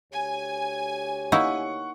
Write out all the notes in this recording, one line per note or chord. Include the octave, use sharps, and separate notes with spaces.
D2 G4 C#5 G#5
A#3 D#4 E4 F#5 C#6